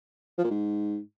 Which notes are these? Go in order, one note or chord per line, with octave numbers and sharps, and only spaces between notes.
F3
A#2
G#2